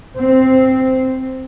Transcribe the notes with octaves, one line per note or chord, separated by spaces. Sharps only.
C4